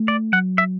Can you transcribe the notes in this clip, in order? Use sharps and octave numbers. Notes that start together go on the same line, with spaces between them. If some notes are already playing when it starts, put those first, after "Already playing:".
Already playing: A3
D5
F#3 F#5
E5